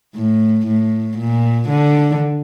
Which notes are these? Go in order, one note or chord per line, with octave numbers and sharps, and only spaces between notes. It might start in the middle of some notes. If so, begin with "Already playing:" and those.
A2
A2
A#2
D3